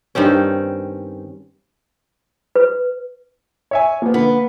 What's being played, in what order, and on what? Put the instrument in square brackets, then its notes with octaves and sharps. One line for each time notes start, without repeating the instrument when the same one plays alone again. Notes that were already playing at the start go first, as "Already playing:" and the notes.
[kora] G2 D#3 C4 C#4
[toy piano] B4
[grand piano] C#5 E5 G#5
[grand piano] F3 B3 [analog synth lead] A#3
[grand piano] D3 [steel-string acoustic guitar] B3